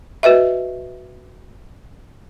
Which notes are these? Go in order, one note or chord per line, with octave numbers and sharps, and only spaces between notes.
F#4 B4 D#5 E5